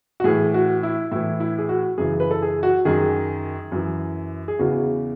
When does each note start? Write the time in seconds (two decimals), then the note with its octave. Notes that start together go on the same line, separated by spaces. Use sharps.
0.20 F#4
0.24 A2 E3 G#4
0.54 F#4
0.83 E4
1.11 A2 E3 E4
1.40 E4
1.58 G#4
1.69 F#4
1.98 F#2 C#3 E3 G#4
2.20 B4
2.31 A4
2.42 G#4
2.63 F#4
2.85 F#2 D#3 G#4
3.72 F#2 E3
4.48 G#4
4.59 E2 C#3 E3 F#4